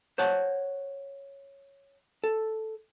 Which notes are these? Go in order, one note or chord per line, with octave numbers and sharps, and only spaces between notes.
C5 C#5 F#5 A5
A4